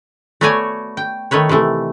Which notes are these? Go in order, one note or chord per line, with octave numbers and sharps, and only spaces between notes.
A3 B3 F#4 C#5 D5 G#5
G5
D#3 A3 B4 C#5
C3 D#3 E3 A3